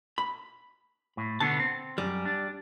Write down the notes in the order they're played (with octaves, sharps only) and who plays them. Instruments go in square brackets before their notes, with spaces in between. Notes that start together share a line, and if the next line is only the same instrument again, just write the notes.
[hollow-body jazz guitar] B5
[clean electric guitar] A2
[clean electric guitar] B2 D3 B3 [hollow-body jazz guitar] A5
[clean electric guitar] C4
[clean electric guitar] F#2 [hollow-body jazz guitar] G3
[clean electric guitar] D4